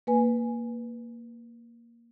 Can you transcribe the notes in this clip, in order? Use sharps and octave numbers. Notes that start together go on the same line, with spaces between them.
A#3 B4 G#5